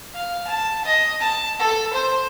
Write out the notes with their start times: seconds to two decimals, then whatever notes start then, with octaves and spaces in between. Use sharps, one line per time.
0.14 F5
0.47 A5
0.85 D#5
1.20 A5
1.59 A4
1.93 C5